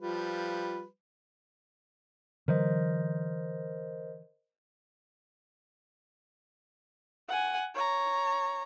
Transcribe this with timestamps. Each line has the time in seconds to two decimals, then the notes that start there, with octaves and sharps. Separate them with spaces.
0.01 F3 G3 F4 B4
2.48 D3 E3 F#3 A#4 C5 D#5
7.28 F#5 G#5
7.75 C#5 A#5